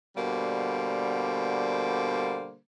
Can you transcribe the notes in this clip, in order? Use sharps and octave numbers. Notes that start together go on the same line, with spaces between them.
B2 D3 G3 A#3 C5